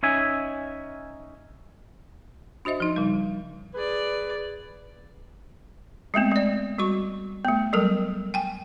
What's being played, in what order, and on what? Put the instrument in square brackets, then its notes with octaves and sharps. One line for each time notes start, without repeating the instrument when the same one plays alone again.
[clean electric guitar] C#4 D#4 E5 G#5
[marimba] D4 F#4 C5 D#5 E5
F3 D#4
C#3 G3
[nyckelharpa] G#4 D5 [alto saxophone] B4
[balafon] G#3 A3 B3 C4
G#3 D5
G3 F#4 C#6
A3 B3
F#3 G3 A4 A#4
G5 G#5